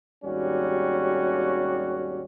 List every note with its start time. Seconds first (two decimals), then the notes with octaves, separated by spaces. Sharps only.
0.24 G#1 D#2 G3 C#4 F#4 G4